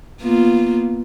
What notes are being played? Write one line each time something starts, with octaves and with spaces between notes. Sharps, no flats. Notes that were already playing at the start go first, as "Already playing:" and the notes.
A#3 B3 F4